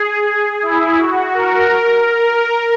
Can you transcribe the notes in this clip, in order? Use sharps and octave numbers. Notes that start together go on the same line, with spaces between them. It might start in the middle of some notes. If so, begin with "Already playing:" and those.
Already playing: G#4
E4
F#4
A#4
A#4